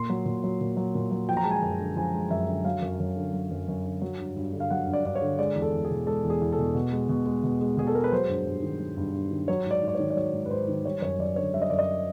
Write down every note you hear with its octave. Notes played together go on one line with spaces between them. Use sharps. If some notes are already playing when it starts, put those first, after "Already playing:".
Already playing: A#2 C6
F#3
A#2
F#3
A#2
F#3
A#2
F#3
F3 G5
A#5
G#3 A5
G#5
F#2
D3
F3 G#5
G#3
F#2 E5
D3
F#3 F5
F#2
F#2
D3
F#3
F#2
F#2
D3
F#3
G2
G2
D3
F5
F#3 F#5
G2
D5
G2 D5
C#5
D3
G#3 D5
E2
A4
E2
G#4
B2
G#3 A4
E2
G#4
E2
A4
B2
B2
G#3
B2
G#3
B2
G#3
B2 G#4
A4
G#3 A#4
B4
F#3 C5
G2
G2
D#3
F#3
G2
G2
D#3
F#3 C#5
G#2 D5
G#2
D5
D#3 C#5
D5
F#3 C#5
G#2
B4
G#2 C5
D#3
G3 C#5
F#2 C#5
F#2 D5
D3 C#5
G3 E5
D#5
F#2 D5
D#5